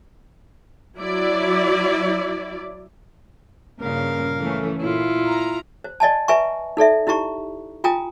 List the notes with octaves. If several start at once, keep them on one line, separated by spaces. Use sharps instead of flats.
F#3 E4 D5
G2 A#2 C#3 A#4 F5
E3 A3 C#4
A#2 E4 F4
A#5
C5
D5 D#5 G#5 A5
B4 E5 G#5 A#5 C#6
D#4 A4 D5 E5
D#4 E4 G4 A#5 C#6
F4 G5 G#5 A#5 D#6